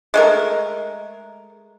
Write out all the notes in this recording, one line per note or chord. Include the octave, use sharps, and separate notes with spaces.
G#3 A3 A#4